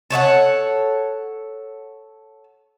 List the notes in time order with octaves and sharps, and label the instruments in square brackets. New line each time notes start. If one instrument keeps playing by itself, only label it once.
[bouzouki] A4 C#5 E5 F#5